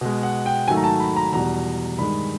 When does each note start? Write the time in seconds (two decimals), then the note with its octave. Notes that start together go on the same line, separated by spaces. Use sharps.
0.01 B2 G#3
0.23 F#5
0.46 G5
0.68 G#2 D#3 F#3 A3 G#5
0.77 A#5
0.84 A5
1.00 B5
1.16 A#5
1.33 E2 B2 G3 A#5
1.98 G2 D#3 G#3 B5